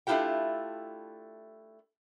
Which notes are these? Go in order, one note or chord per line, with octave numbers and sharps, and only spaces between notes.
A3 D4 E4 F4 G4 G5